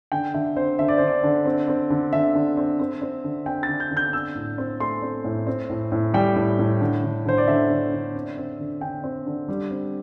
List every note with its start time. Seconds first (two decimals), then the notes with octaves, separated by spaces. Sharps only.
0.12 D3 G5
0.34 D3 E5
0.56 C4 C5
0.79 D3 E5
0.88 D5
0.98 D3 C5
1.08 D5
1.23 D3
1.46 C4
1.68 C4
1.90 D3
2.13 D3 E5
2.35 D3
2.57 C4
2.80 C4
3.02 C4
3.24 D3
3.46 C4 G5
3.63 A6
3.68 D3
3.80 G6
3.91 D3
3.97 G6
4.13 C4 E6
4.35 A2
4.58 C4
4.80 A3 C6
5.03 C4
5.24 A2
5.47 C4
5.70 A2
5.92 A2
6.14 G3 G5
6.36 A2
6.59 A2
6.81 D3
7.03 D3
7.25 D3 C5
7.38 D5
7.47 D3 E5
7.70 D3
7.93 D3
8.15 C4
8.38 C4
8.59 D3
8.81 D3 G5
9.04 C4
9.26 D3
9.48 G3
9.71 C4